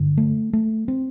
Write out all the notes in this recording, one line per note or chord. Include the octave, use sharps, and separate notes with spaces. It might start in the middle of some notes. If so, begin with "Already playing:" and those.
Already playing: G2 D3
A3
A3
C4